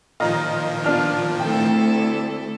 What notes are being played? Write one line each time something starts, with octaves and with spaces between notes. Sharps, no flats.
A#2 D#3 F3 F4 D#5 A#5
B3 D4 F4 F6
D2 C4 E4 A4 G5